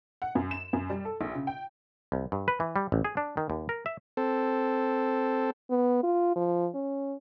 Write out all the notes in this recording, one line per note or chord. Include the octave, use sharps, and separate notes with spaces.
F#5
F#2
E7
F#2
G3
A4
A#1
C#3
G5
C2
G2
B4
E3
G3
A1
G#4
D4
D#3
D#2
A#4
E5
C4 A4
B3
F4
F3
C#4